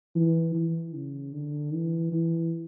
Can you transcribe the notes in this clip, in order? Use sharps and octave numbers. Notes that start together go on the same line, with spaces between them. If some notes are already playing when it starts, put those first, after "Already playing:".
E3
E3
C#3
D3
E3
E3